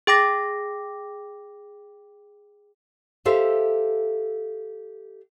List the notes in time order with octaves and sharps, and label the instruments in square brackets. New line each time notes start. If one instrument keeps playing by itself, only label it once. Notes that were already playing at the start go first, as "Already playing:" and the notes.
[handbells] G#4 G5 D6 A#6
[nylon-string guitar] G4 A4 C5 E5 F5